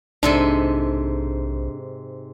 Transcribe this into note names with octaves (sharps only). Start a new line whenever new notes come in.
B1 G#2 C3 D4 A4